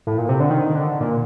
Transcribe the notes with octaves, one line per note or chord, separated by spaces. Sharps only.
A2
A#2
C3
D3
D#3
D3
A#2